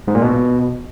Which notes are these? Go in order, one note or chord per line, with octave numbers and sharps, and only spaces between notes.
G#2
A#2
B2